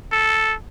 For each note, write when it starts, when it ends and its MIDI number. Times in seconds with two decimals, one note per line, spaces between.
0.12 0.54 69